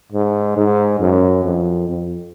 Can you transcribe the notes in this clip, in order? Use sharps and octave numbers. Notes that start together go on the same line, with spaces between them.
G#2
G#2
F#2
F2
F2